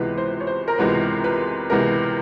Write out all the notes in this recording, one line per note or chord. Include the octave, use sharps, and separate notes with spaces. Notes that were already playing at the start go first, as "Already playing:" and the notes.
Already playing: C#2 C3 E3 G#3 B3 B4
C5
C#5
C5
A#4
C#2 C3 E3 G#3 B3 B4
B4
C#2 C3 E3 G#3 B3 A#4